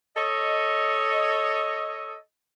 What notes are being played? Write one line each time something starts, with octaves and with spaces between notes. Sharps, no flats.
A4 C#5 D#5